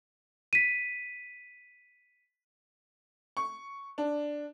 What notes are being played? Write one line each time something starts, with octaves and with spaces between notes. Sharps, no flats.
B6 D#7
C#6
D4